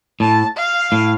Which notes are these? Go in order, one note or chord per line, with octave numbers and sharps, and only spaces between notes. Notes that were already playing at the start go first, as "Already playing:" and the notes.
A2 A5
F5
A2